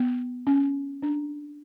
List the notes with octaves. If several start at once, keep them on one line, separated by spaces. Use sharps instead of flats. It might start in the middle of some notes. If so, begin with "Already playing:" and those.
Already playing: B3
C#4
D4